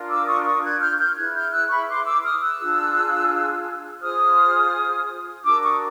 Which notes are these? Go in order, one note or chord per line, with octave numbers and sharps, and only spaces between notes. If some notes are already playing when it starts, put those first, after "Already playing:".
Already playing: D4 F4 A#4
D6 E6
C#6 D#6
C#6 D#6
F#6 G#6
F6 G6
F6 G6
E4 G#4 B4 F#6 G#6
F6 G6
E6 F#6
B5 C#6
C6 D6
D6 E6
D#6 F6
E6 F#6
D4 F4 G#4
F4 G#4 C5 D#6 F6
D4 F#4 A#4 D6 E6
C#6 D#6